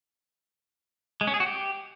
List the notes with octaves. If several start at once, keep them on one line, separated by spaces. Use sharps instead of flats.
G#3
C#4
G#4
F#4
G4